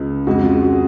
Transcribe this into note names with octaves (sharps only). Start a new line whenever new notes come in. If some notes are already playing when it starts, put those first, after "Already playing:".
Already playing: C#2 C#3 G#3 F4
F2 C#3 G#3 F#4
F4
F#4
G#4